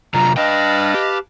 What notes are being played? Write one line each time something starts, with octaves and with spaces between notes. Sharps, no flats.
C3 F#3 F4 A#5
D4 B4 D#5 F5 G5 A5
G4